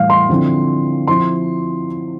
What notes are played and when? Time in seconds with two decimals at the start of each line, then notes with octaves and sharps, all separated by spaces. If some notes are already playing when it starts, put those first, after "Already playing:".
Already playing: A2 E3 G3 F5
0.10 C6
0.29 D3 F3 C4 E4
1.07 F3 C4 E4 C6